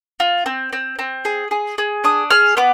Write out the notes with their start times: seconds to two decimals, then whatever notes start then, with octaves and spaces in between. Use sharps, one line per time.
0.20 F4
0.46 C4
0.73 C4
0.99 C4
1.25 G#4
1.51 G#4
1.78 G#4
2.04 D4 D#6
2.30 G#4 F6
2.57 B3 D6